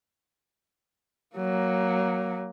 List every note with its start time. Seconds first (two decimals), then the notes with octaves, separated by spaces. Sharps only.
1.36 F#3 A#3